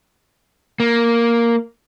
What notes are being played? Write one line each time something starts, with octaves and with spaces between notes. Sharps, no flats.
A#3